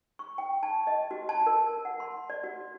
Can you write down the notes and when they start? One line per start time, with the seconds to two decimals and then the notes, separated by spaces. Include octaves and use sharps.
0.19 C#6
0.38 G5
0.63 A5
0.87 D#5
1.11 F#4
1.29 A5
1.46 A#4
1.85 F#5
2.00 C6
2.30 D5
2.44 F#4